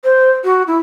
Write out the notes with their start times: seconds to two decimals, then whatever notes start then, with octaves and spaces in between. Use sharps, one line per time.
0.04 C5
0.44 F#4
0.67 E4